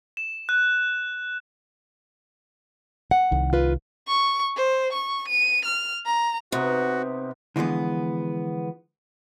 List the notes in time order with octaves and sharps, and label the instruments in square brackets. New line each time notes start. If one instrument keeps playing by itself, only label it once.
[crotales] E7
F#6
[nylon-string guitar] F#5
[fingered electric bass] C2 D#3
[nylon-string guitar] F4 B4
[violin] C#6
C5
C#6
D#7
F6
A#5
[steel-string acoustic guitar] C3 [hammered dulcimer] B3 D#4 C#6 [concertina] F#4
[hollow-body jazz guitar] D3 E3 F3 G#3 B3